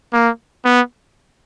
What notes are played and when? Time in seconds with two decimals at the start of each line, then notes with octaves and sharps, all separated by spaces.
0.13 A#3
0.65 B3